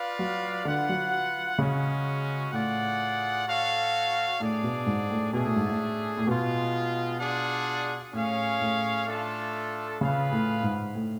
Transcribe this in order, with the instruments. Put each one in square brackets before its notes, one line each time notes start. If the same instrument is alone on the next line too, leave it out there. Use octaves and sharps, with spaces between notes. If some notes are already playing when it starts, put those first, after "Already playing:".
Already playing: [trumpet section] F4 B4 D5 F5
[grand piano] F#3
[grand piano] D3 [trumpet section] F4 B4 F#5
[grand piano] F#3
[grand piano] C#3 [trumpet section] G#3 C#4 F#4
[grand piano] A2 [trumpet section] F4 G#4 D5 F#5
[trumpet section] F#4 A4 C#5 F5
[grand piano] A2 [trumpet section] D4 G#4 D5
[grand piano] B2
G#2
A2
[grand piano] B2 [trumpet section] A3 D4 G#4
[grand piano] A2
G#2
A2
A2
[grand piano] B2 [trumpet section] G#3 B3 F4
[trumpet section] D4 F4 G#4 D5 F#5
[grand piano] A2 [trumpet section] C#4 G#4 C#5 F5
[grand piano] A2
[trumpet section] A3 D4 F4 A4
[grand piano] C#3 [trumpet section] F4 G#4 B4 F5
[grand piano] A2
G#2
A2